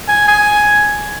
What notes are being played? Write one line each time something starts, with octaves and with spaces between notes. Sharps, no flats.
G#5
G#5